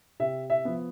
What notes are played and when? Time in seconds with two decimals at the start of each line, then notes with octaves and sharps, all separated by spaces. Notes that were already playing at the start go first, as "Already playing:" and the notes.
0.20 C3 E5
0.50 E5
0.65 F3 B3